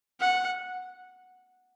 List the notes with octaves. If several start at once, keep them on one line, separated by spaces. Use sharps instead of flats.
F#5